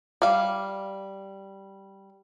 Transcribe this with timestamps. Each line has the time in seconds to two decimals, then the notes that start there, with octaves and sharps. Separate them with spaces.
0.22 G3 F5